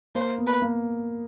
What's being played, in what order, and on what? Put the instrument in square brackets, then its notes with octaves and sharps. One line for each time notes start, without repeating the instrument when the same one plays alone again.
[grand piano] A#3 [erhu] C5
[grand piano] B3
[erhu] B4
[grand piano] A#3